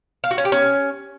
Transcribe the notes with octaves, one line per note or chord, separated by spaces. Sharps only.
F5
F#4
C#4
G4
C#4